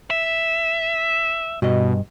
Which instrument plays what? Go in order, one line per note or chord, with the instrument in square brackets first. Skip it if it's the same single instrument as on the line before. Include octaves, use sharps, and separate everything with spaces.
[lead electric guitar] E5
[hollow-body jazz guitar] G2 D#5 [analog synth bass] B2